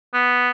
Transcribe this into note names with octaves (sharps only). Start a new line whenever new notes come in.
B3